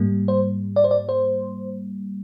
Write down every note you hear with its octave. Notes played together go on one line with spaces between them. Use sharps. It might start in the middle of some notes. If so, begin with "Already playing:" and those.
Already playing: G#2 G3 A#3
C5
D5
C5
D5
C5